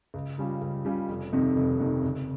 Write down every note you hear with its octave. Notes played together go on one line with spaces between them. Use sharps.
C#2
C#3 G3 C#4 F4
C#2
C#3 G3 C#4 F4
F1
F2 C3 D#3
F1
F2 C3 D#3
C#2